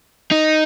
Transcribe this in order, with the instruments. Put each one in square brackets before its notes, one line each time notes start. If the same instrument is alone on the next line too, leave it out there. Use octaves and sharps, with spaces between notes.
[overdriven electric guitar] D#4